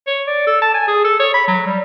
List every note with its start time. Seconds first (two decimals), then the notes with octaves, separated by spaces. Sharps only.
0.07 C#5
0.27 D5
0.47 A4
0.62 A5
0.75 G#5
0.88 G#4
1.05 A4
1.20 C#5
1.34 B5
1.48 F#3
1.66 G3